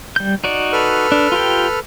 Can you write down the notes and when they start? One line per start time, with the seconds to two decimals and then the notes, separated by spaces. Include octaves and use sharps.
0.16 G3 G6
0.44 D#4 F#4 D5
0.73 A4 B4 F6
1.12 D4
1.32 F4 G4 G5